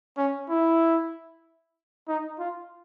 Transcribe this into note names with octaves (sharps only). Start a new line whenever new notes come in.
C#4
E4
D#4
F4